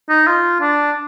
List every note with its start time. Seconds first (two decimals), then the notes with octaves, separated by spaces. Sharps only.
0.09 D#4
0.27 F4
0.61 D4